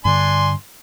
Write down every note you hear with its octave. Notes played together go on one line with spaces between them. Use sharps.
G2 D3 D4 G#5 C6